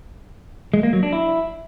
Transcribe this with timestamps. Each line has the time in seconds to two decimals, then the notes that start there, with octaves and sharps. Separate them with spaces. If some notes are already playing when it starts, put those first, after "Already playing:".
0.74 G#3
0.83 A#3
0.93 F#3
1.03 D4
1.13 E4